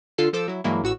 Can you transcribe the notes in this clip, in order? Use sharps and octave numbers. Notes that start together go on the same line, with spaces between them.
D3 F4 A4 C7
F3 A4 C5 D6 E6
F#3 E4
G2 E3 F#3 G#3 A#3 E4
A1 F#4 E6